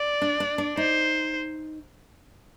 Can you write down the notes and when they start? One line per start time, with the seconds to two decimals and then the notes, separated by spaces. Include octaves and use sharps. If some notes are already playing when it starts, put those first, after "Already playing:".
Already playing: D5
0.22 D4
0.40 D4
0.58 D4
0.77 D#4 C5